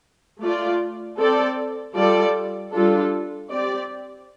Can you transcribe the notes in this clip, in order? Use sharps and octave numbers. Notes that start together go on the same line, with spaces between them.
A3 F4 D5
C4 A4 D5
G3 F4 A4 D5
G3 D4 F4 A4
C4 G4 D5